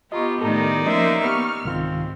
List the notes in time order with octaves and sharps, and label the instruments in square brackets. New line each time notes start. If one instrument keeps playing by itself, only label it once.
[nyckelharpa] B3 G4 [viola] F4 [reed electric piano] D#5 A#5 C#6
[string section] A2 D#3 [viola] D#4 D5 [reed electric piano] A4 A#5
[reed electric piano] F3 C#4 D#5 [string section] A#3 C5 [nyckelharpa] A#4 E5
[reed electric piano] A#3 B3 B4 [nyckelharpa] G4 [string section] C#6 F6
[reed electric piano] C2 D#3 F4 [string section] G#2 [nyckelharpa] C4